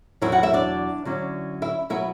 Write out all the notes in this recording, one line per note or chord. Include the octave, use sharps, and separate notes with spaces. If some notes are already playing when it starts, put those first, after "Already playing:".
E2 B2 F#3 B3 E4 E5
F#4 F#5
E4 E5
D4 D5
D3 F#3 C#4 E4
E4 E5
B2 F#3 B3 E4 E5